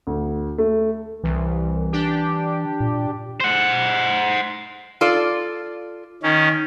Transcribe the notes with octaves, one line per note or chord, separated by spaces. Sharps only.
D2
A3
C2 E3
D4 G4
A#2
C5 F#5
F4 A4 D5
D#3 C#4